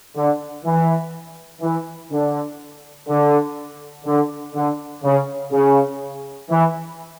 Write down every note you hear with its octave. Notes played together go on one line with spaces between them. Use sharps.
D3
E3
E3
D3
D3
D3
D3
C#3
C#3
E3